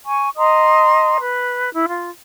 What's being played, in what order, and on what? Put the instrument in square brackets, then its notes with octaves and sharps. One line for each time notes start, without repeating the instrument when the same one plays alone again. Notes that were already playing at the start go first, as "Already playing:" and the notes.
[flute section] G#5 C#6
D#5 A#5 C6 D#6
B4
E4
F4